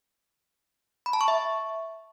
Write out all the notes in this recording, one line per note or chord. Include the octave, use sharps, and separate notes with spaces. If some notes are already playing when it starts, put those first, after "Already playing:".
B5
A5
C#6
E5